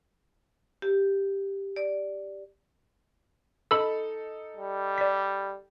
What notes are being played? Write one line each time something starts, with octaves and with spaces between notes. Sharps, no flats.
G4
D5
D#4 A4 B5 E6
G3
D5 B6